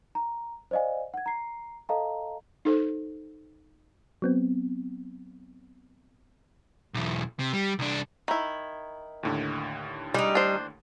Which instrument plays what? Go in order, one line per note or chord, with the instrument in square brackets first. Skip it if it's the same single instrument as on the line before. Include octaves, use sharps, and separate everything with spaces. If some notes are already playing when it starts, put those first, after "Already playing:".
[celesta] A#5
C5 D5 D#5 F5 G#5
F#5 G#6
A#5 C7
A4 D#5 F5 A5 A#5
[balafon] D#4 A4 C5
[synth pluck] F#3 B3 C4
[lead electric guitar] B1 E2
C3
G3
C2 D4
[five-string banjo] D#3 E4
[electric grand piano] D#2 A2 D3
[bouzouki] G3 D#4 [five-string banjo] G#3
[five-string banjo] D4 C5